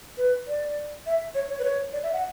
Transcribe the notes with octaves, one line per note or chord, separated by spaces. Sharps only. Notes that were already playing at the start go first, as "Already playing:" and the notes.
B4
D5
E5
C#5
C#5
B4
C#5
D5
E5
F#5